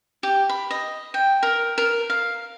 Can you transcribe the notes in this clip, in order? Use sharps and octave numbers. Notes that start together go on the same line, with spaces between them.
G4
B5
D#5
G5
A#4
A#4
F5